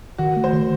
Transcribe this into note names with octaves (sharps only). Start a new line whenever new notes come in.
D#3 F#4
A3
C5
D#3